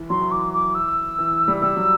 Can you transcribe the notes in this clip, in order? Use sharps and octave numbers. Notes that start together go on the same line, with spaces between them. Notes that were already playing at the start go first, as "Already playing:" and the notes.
Already playing: E3
F#3 C6
E3
D6
D6
E6
E3
G3
G3 E6
F#3